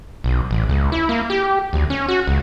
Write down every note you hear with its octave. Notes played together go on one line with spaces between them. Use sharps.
B1
A1
C#2
E4
A#3
G4
D2
C#4
F#4
C#2